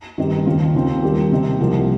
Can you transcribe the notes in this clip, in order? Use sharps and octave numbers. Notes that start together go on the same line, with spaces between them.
G2 D#3 C4 D#4 G4
D#2 D#3 C4 F4
D#2 D#3 C4 F4
D#2 D#3 G3 A#3 G4
C3 G3 C4 D#4
C2 C3 F3 A#3 G4